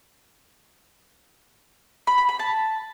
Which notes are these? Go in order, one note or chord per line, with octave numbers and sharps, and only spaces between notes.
B5
B5
B5
A5